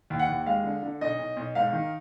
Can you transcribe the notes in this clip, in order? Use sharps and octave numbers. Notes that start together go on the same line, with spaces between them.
D#2
F#5
D#2
G#3 F5
D3
D3
B1 D#5
B1
B1
G#2 F5
D#3